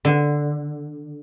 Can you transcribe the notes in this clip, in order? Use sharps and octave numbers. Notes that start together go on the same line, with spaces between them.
D3